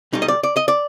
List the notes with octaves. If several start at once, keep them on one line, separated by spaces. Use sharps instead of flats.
B1 B2 G3 D#4
D#5
D5
D5
D#5
D5